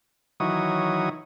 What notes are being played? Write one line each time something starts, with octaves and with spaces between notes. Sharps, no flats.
D#3 E3 F#3 C#5 D#6